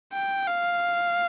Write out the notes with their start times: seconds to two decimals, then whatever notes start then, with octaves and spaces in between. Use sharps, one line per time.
0.13 G5
0.47 F5